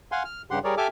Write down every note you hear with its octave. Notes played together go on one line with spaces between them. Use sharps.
F5 F#5 G#5 C6
F6
G2 C#3 G4 F#5 C6
G3 G#4 A#4 C#5 D5
G4 A4 E5 G#5 D6 F6